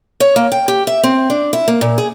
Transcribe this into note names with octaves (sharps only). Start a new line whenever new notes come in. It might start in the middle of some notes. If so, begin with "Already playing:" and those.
C#5
A#3
G5
G4
E5
C4
D4
E4
A#3
A#2
G#4